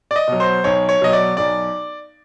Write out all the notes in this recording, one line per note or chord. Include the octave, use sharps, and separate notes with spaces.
D5
D#5
B2 F#3
C5
B1 C#5
C#5
B2 F#3 D#5
D5
B1 D5